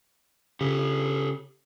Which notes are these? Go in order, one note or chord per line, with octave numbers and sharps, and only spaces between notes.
C#3 G4 A4